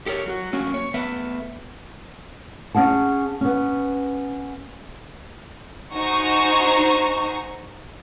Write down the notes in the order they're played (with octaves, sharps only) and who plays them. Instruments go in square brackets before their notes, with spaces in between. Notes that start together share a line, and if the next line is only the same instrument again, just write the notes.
[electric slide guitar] G4 A4 A#4 C#5
F#3 F4 F#4
F#3 A3 A#3 C#4 F#4
C#5
A3 B3 B4 E5
[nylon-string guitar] C#4 G#4 F#5 A5
B3 C#4
[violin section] D#4 F#4 C5 G#5 A#5 C#6